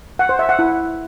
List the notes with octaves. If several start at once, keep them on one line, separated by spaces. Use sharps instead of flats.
F#5
C5
E5
F#5
E4